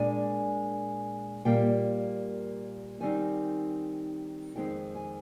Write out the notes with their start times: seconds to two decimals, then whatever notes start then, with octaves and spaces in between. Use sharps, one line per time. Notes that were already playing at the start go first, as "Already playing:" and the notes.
Already playing: A#2 G#3 D4 G#5
1.45 A#2 G3 A#3 G5
3.00 D#3 G3 C4 D#4 G#5
4.56 F2 D#3 G#3 C4 G5
4.95 G#5